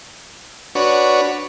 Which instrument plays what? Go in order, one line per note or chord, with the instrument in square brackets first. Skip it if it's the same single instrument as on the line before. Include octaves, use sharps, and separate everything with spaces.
[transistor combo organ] D4 F#4 B4 C#5